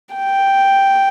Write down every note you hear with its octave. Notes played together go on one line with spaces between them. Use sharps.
G5